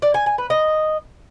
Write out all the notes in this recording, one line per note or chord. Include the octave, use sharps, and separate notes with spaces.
D5
G#5
G#5
B4
D#5